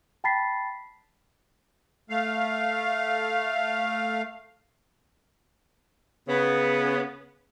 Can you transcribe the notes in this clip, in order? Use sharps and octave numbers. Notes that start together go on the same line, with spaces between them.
G5 A5 B5 A6 B6 C7
A3 F5
C#3 B3